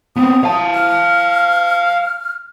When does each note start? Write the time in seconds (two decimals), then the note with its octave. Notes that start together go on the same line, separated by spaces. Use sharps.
0.16 B3 C4 D#6
0.44 F5 A5
0.75 F6